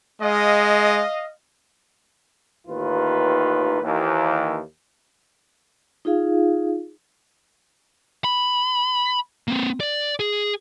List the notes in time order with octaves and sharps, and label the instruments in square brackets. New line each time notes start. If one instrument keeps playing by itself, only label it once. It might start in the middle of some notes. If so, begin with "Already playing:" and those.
[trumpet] G#3 [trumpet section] D#5 F5
[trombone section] A1 D#2 D#3 F4 B4
D#2 E3
[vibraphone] D#4 F4 G#4 F5
[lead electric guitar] B5
A#3 C4
D5
G#4